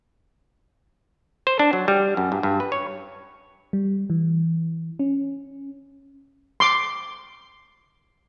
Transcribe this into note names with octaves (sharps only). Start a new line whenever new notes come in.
C5
D4
F#3
G3
F#2
G2
G2
B4
C#5
G3
E3
C#4
C6 D6